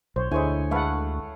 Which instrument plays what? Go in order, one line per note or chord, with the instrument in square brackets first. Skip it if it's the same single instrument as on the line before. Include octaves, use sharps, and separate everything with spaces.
[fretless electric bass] B1 [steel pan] C5 C#5
[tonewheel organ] D2 [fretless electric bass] D3 [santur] G#3 C#5 G#5 [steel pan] E4 C5
[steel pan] G#3 B4 F#5 [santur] A3 F5 B5